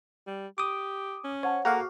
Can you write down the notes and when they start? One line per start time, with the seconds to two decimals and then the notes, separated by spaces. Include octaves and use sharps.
0.27 G3
0.58 G4 D6 D#6
1.24 C#4
1.43 C5 C#5 F#5 A5
1.65 A#3 F#4 G#4 A4 F5 F#5 A#5